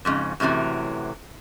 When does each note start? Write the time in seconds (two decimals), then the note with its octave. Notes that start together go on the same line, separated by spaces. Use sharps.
0.05 F2 G#2 C#3
0.40 F#2 A2 C3 E3 F#3